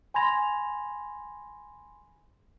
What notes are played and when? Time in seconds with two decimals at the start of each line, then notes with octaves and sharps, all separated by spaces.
0.14 G#5 B5 C6 G#6 A#6 F7